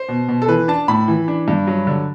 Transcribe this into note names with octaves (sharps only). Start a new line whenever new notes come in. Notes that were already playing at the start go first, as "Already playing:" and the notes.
Already playing: C5
B2
B2
A4
E3 B4
D4 A5
A2 B5
E3
D4
G2
F#3
D3